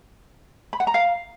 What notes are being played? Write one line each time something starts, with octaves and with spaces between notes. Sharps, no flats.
B5
F#5
A#5
F5